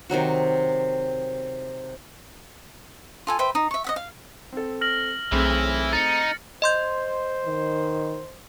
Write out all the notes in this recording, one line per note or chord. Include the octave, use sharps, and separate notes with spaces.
C3 D#3 F#3 F#4
F4 A4 G#5
B4 C5 E5 G5
D#4
E5 C#6
D#5 E5 F#5
F5
C4 A4
F6 A#6 F#7
B1 E3 A3 C4 E4 G#4
D#4 A6 C#7
C5 D#5 C6 G6
D#3